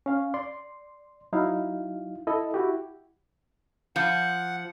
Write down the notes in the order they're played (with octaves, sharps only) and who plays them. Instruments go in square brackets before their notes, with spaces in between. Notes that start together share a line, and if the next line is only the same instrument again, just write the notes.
[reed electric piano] C#4 F5
D5 C6
F#3 D#4 E4 F5
E4 A4 D#5
E4 F#4 G4
[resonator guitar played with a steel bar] F3 [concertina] F#5